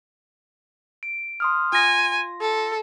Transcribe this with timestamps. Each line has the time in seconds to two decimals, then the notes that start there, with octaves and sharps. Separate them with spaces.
1.03 D7
1.40 C6 D#6 F6
1.73 F4 G#5 C6 A#6
2.41 A4